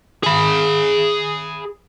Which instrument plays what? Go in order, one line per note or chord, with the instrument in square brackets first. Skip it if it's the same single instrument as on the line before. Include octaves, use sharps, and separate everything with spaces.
[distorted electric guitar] G#4 B5